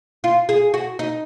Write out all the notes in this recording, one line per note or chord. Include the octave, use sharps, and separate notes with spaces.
F4
G#4
F#4
D#4